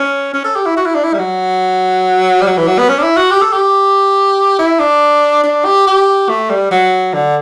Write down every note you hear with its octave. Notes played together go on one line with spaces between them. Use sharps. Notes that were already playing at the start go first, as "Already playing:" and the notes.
Already playing: C#4
C#4
A4
G4
E4
F#4
E4
D4
E4
G3
F#3
G3
F#3
E3
F#3
B3
C#4
D4
E4
F#4
G4
A4
G4
E4
D4
D4
G4
G4
A3
G3
F#3
D3